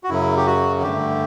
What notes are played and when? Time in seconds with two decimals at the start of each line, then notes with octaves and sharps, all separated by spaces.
0.04 F#4
0.09 F#2 C#3 F#3 E4
0.37 G4
0.47 F#4
0.82 G2 D3 A3 G4